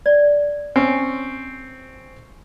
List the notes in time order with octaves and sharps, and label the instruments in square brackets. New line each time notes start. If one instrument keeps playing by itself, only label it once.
[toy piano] D5
[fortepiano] C4 C#4